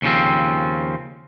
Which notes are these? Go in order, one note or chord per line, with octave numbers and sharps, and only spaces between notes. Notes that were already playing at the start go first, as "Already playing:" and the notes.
D#2 C#3 F3 C4